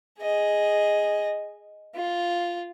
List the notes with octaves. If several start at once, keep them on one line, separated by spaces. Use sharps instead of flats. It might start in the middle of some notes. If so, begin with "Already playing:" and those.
G#4 D#5
F4